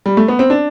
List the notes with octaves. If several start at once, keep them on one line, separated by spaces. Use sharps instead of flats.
G3
A3
B3
C4
D4